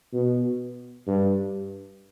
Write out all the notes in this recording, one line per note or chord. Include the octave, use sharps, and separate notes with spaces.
B2
G2